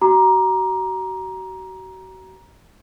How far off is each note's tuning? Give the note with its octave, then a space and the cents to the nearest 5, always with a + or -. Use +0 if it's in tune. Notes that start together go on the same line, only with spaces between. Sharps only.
F#4 +35 A#5 +15 D6 +20